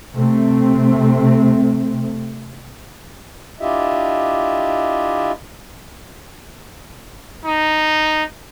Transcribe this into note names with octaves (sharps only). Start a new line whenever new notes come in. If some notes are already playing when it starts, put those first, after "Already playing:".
C3 A3 C4
D4 E4 F4 G4 D#5 E5
D#4